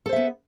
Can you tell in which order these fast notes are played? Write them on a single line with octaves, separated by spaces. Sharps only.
A4 C5 E5 B3